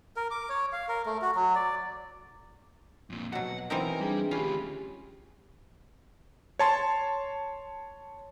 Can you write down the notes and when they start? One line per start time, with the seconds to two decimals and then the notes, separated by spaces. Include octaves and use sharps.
0.16 A#4
0.31 D6
0.49 C#5
0.73 F5
0.89 A#4
1.06 A3
1.22 F#4
1.35 F#3
1.55 D5
3.10 F2 A#2
3.33 B2 F#3 F#5
3.70 E3 C4 D#4 A#4
4.00 G3 D4 G#4 G5
4.31 D2 C#4 F4 G4 B5
6.59 C#5 A5 C6